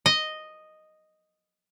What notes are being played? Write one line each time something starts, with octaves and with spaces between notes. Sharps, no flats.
D#5